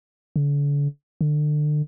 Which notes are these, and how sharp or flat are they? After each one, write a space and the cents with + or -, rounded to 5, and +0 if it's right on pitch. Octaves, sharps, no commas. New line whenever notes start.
D3 -40
D3 +30